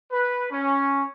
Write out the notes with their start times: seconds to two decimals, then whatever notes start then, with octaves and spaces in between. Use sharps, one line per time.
0.12 B4
0.52 C#4